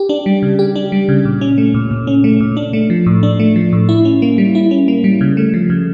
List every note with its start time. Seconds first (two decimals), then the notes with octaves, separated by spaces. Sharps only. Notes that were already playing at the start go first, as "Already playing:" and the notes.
Already playing: G4
0.09 D4
0.26 G3
0.43 C#3
0.59 G4
0.76 D4
0.92 G3
1.09 C#3
1.25 A#2
1.41 C#4
1.58 A3
1.74 A#2
1.91 A#2
2.07 C#4
2.24 A3
2.40 A#2
2.57 D4
2.73 A3
2.90 F3
3.06 A2
3.23 D4
3.40 A3
3.56 F3
3.73 A2
3.89 E4
4.05 C#4
4.22 A#3
4.38 G3
4.55 E4
4.71 C#4
4.88 A#3
5.04 G3
5.21 C#3
5.37 A3
5.54 F3
5.70 C#3